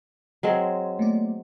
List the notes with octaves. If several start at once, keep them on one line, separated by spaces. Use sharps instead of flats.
F#3 G#3 C4
A3 A#3 D5